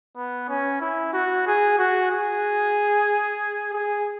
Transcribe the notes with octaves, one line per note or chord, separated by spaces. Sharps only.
B3
C#4
E4
F#4
G#4
F#4
G#4
G#4